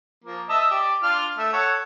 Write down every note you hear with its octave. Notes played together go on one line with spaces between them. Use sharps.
F3 A#3
D#5 E5 A5
G4 D5
D4 F4 F6
A3 E5
A4 C#5 F#5